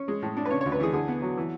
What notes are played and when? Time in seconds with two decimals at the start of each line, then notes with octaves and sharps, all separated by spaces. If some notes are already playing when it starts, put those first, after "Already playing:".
Already playing: C#4
0.08 G#3
0.22 A2
0.37 D4
0.46 B4
0.51 C#3 C#5
0.61 C#5
0.66 D2
0.72 B4
0.80 E3 G#4
0.93 D3 G#4
1.08 B3
1.22 F#3
1.37 E3